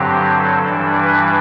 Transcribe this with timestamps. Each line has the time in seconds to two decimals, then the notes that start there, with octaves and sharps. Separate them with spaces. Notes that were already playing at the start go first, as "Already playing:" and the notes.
Already playing: G2 D3 F#3 C4 G4
0.37 A4
0.68 G2 E3 G3 D4
1.00 B4